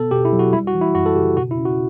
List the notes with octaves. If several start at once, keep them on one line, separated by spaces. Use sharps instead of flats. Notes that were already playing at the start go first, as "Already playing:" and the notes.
Already playing: B2 B3 A4
B2 G4
E4
F#3
F#4
G3 E4
F#4
E3
E4
F#2 F#4
A4
C#3 G4
B2 F#4
E4
C#4
F#4